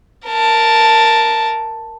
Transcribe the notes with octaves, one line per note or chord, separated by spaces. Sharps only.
A#4 A5